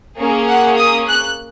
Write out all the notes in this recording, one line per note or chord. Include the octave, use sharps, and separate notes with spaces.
A#3 C#4 G#4
F#5
D#6
F#6